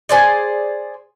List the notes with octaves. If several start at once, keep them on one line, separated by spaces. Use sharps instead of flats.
G#4 C5 D5